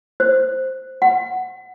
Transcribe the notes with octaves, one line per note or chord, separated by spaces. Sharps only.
C5
F#5